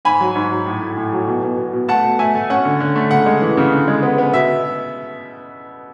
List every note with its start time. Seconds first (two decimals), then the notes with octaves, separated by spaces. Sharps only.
0.05 G#2 G#5 B5
0.20 F#3
0.35 G#2
0.51 F#3
0.66 A2
0.82 A2
0.97 A2
1.12 F#3
1.27 B2
1.43 B2
1.58 B2
1.73 B2
1.89 A3 F#5 A5
2.04 B2
2.19 A3 E5 G#5
2.35 A3
2.50 C#4 F#5
2.65 D3
2.80 D3
2.96 A3
3.11 C#3 F#5
3.26 G#3
3.42 E3
3.57 C#3
3.72 D3
3.88 G#3
4.03 B3
4.18 B3
4.34 B2 E5